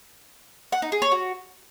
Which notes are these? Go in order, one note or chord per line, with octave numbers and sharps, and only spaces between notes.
F#5
D#4
G#4
C#5
F#4